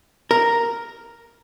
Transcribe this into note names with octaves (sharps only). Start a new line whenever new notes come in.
A#4